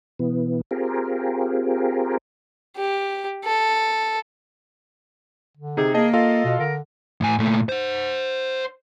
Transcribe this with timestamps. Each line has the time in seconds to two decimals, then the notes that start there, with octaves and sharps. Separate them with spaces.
0.19 B2 E3 B3
0.71 C4 F4 G4 G#4 A#4
2.77 G4
3.45 A4
5.57 D3
5.77 C3 D#4 G#4
5.94 A#3 G#4 D#5 A5
6.13 F4 A4 D#5 F5
6.45 B2
6.59 D3 A#4
7.21 A2 G#5
7.39 A#2 A3
7.69 C5 F#5